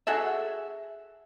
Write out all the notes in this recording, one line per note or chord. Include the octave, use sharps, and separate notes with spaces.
F#4 G#4 A4 E5